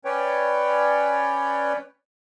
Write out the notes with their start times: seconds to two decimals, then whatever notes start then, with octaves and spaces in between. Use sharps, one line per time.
0.05 C#4 B4 C#5 D5 G5